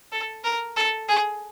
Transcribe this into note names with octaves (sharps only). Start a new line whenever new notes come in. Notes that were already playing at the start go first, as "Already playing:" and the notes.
A4
A#4
A4
G#4